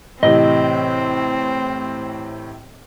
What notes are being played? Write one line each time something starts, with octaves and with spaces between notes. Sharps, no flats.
A2 C3 E3 C4 D#5